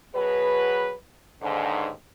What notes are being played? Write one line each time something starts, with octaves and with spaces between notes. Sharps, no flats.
B2 F#3 G#4 B4
D#2 G#2 D3